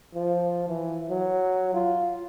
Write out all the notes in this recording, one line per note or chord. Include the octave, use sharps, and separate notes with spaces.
F3
E3
F#3
F4